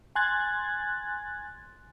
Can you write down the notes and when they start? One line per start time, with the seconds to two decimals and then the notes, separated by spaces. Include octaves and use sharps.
0.15 G#5 C6 F#6 G#6 A6